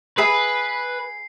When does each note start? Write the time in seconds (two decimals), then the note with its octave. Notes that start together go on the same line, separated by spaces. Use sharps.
0.18 G#4 B4 E5 B5 C7